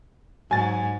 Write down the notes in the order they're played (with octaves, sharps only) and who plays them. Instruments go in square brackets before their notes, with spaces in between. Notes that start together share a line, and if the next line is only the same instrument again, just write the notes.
[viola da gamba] G#2 [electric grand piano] F#3 A6 [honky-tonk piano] G#5